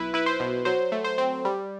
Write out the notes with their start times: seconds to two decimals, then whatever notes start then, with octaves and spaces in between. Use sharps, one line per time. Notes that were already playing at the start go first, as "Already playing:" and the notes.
Already playing: B1 E4 B4
0.14 E4 B4
0.26 C5
0.40 B2
0.65 F#3 C5
0.92 A3
1.04 C5
1.18 C4
1.45 G3